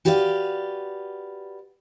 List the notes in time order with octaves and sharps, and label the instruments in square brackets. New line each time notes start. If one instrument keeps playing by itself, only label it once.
[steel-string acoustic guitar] F#4 G4 B4 D5 E5 F5